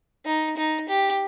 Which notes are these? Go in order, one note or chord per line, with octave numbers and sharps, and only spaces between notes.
D#4
D#4
G4